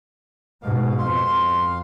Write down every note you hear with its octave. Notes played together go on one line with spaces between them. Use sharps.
G#2 B2 F5
F2 F4 F5 C6